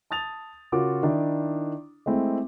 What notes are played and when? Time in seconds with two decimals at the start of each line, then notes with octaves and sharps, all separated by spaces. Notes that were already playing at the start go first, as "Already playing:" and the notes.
0.11 A5 D#6 A6 F7
0.72 C#3 F4 F#4 A#4 D6
1.03 D#3 D4 E4
2.06 G#3 A3 C4 E4